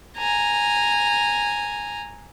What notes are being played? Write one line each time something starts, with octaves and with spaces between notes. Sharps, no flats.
G#5 A#5